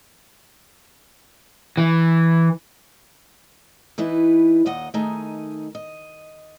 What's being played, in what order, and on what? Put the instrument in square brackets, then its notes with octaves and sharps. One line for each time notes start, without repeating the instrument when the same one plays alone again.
[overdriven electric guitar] E3
[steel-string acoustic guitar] E3 D#4 E4 B4
D#2 A#2 D#5 F#5
D#3 A3 D#4 G#4
D#5